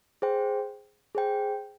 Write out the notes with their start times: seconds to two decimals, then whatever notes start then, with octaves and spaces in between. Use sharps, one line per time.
0.22 G#4 C5 G5
1.15 G#4 C5 G5